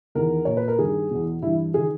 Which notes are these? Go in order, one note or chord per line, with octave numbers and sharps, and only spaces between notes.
E2 D#3 A#4
A#2 C#5
B4
A#4
G2 D#3 G#4
E2 B2
G2 E3 E4
D#3 G#4